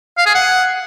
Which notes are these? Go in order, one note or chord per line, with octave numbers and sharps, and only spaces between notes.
F5
G#4
F#5